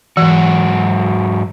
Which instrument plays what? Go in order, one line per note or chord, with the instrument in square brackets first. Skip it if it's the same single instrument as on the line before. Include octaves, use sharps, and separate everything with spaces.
[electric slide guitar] G#2 F#3 F#4 [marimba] E3